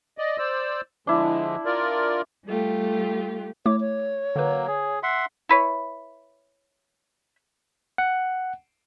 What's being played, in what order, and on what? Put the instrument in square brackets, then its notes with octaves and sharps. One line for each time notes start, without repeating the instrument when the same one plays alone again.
[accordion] D5 D#5
C5 D5 E6
[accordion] D3 F3 G#3 [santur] D4 E4
[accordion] F4 A#4 D5
[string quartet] G3 A3 F4 G4
[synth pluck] A3 E4 D6 [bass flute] C#5
[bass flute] C#5
[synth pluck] D3 B4 [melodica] F#3 A#3
[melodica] G#4
E5 F#5 C6
[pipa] E4 B4 C#5
[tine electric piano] F#5